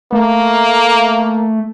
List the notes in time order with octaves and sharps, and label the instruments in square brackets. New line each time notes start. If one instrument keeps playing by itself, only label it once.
[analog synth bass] A3 [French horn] A#3